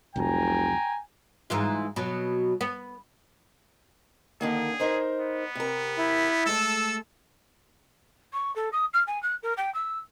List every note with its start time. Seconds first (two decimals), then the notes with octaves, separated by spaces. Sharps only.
0.16 F1 C2 F2 F#3 G5 G#5 A#5
1.50 G#2 E3 F4
1.96 B2 F#3
2.61 B3
4.41 D3 D#3 A#3 G#4
4.80 D#4 A#4 C5
5.20 B3
5.55 C3 A#4
5.98 E4
6.46 G#3 A3 A4 E6
8.33 C#6
8.56 A4
8.72 D#6
8.94 F6
9.07 G#5
9.22 F#6
9.43 A#4
9.57 G5
9.74 E6